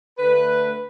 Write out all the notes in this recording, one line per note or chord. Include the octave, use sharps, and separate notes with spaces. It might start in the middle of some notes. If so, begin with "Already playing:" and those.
D3 A3 B4